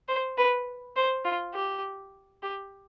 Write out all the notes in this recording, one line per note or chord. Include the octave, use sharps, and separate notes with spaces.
C5
B4
C5
F4
G4
G4